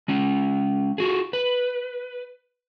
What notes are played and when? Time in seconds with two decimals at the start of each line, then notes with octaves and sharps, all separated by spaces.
0.08 G#3 C#4
0.98 F4 F#4 G#4
1.33 B4